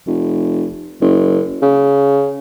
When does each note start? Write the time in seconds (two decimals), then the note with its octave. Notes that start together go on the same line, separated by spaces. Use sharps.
0.07 F1
1.01 F#1
1.62 C#3